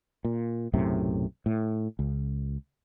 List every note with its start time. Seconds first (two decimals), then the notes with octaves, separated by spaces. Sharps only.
0.25 A#2
0.73 B1 F#2 A2 C3
1.46 A2
1.99 C#2